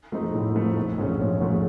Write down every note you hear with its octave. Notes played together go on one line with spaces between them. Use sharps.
F3 A3 C4 D#4
A2
F3 A3 C4 D#4
A#1
G#2 F3 A3 C#4
A#1
G#2 F3 A3 C#4